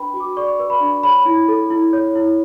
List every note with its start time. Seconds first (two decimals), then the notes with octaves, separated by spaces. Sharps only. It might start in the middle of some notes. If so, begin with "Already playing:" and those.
Already playing: D4 B4 G5 B5
0.14 F#4
0.20 D6
0.37 D5 C#6
0.59 B4
0.70 B5
0.81 D4
1.03 C#5 B5
1.25 E4
1.48 A4
1.70 E4
1.93 C#5
2.16 E4